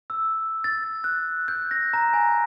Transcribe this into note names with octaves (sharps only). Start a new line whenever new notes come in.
E6
A6
F#6
G6
A#6
A#5
G#5